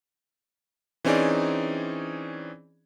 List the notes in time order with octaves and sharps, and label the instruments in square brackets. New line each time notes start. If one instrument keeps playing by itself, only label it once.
[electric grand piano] E3 C4 C#4 D#4 G#4 D5